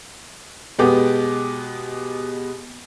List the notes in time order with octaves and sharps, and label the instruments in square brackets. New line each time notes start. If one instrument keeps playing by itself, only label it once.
[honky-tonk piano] B2 G#3 B3 G4 D6